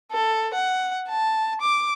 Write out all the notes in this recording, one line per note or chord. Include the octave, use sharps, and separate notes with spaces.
A4
F#5
A5
D6